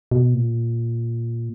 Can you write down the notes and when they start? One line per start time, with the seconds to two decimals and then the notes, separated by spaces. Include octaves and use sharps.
0.11 B2
0.34 A#2